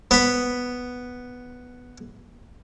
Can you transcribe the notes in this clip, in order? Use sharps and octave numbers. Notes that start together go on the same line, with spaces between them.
B3 B5